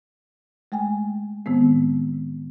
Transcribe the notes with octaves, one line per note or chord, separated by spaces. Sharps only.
G#3 A3 G5 G#5
A2 D#3 G#3 B3 C4